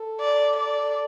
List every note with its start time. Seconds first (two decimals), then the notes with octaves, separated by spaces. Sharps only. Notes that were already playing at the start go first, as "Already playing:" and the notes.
Already playing: A4
0.20 D5
0.56 D5